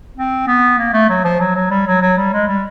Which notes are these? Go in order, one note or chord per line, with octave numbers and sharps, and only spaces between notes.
C4
B3
A#3
A3
F#3
F3
F#3
F#3
G3
F#3
F#3
G3
G#3
G3